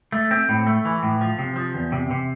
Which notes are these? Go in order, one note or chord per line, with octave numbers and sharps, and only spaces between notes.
A3
C4
A2
A3
E3
A2
F3
C3
F3
E2
C3
C3